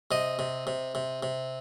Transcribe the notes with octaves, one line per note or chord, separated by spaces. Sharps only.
C3 D#5
C3
C3
C3
C3